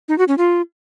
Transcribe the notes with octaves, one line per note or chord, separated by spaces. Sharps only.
D#4
F#4
C#4
F4